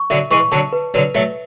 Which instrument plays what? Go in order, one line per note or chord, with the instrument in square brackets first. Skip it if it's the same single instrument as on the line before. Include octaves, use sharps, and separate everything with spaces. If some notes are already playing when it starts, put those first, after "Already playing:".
Already playing: [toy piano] C#6
[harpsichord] D3 F#3 [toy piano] E5
[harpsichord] E3 G#3 [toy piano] C#6
[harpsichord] D3 F#3 [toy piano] A5
[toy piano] B4
[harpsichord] D3 F#3 [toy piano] B4
[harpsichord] F#3 A3 [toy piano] E5